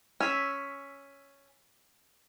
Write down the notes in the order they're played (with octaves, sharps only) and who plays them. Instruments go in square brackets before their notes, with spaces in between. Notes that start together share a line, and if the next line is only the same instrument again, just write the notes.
[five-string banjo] C#4 [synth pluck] E6 B6